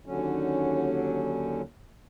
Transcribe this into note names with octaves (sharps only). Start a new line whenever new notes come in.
D#2 D3 F#3 C#4